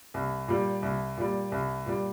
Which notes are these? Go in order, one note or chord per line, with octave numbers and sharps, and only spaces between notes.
C2
A#2 G3
C2
A#2 G3
C2
A#2 G3